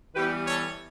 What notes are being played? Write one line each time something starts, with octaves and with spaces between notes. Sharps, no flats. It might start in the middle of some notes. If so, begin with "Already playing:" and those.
E3 G3 B3 G4 B4
A4 C#5